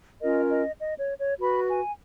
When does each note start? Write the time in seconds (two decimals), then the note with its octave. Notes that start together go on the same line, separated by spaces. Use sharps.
0.21 C#4 F4 A#4 D#5
0.50 D#5
0.80 D#5
1.00 C#5
1.20 C#5
1.39 F#4 B4 B5
1.69 G#5